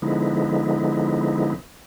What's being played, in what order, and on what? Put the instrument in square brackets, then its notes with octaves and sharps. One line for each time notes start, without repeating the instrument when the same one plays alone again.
[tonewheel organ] D3 F3 G#3 B3 D#4 E4